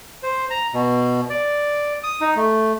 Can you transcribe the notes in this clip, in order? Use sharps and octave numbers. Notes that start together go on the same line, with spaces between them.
C5
A#5
B2
D5
D#6
D#4
A3